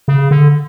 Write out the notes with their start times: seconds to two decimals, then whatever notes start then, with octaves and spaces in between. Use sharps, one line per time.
0.08 C#3
0.31 D3